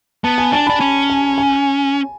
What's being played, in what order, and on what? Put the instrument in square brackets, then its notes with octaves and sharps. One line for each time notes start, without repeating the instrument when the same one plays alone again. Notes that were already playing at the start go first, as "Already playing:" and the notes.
[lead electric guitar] B3 [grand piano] A5
[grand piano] G#5
[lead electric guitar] D4 [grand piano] A5
[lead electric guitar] D4 [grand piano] B5
[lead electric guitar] C#4
[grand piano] G#5
G#5